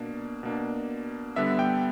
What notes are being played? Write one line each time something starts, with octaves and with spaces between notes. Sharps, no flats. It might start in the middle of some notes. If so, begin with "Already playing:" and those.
Already playing: B2 A#3 D4
B2 A#3 D4
D3 G3 B3 D4 E5
G5